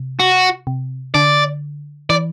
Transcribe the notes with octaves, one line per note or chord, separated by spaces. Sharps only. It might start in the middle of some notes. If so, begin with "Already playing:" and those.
Already playing: C3
F#4
C3
D3 D5
E3 D5